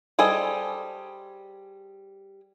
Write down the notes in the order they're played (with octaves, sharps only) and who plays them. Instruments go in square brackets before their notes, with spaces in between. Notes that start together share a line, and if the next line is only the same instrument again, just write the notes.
[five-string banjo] G3 G#4 A4 C5 D#5